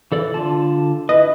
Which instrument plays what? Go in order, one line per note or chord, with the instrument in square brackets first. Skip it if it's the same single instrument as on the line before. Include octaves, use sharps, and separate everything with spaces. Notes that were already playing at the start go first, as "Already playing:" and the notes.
[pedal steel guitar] E3 A4 D5
D3 F4 A5
[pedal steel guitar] E4 B4 [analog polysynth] D#5